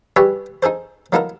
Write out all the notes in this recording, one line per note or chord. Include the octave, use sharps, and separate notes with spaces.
G3 G4 G#4 B4 C#5 E5
D#4 G#4 A4 C5
F#3 A#3 D#4 E4 A4 A#4